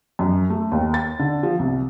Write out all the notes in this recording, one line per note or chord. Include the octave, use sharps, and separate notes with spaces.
F#2
A3
D#2
A6
D3
F3
C2